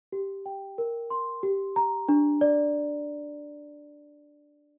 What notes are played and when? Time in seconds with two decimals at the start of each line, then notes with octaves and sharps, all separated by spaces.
0.12 G4
0.46 G5
0.78 A#4
1.10 C6
1.43 G4
1.76 A#5
2.09 D4
2.41 D5